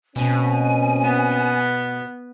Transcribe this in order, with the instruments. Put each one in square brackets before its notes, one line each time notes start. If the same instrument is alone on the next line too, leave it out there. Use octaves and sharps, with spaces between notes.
[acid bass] B2 [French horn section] A#3 C4 C#4 [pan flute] G#5
[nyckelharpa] B3